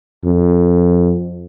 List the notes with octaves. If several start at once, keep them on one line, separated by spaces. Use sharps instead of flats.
F2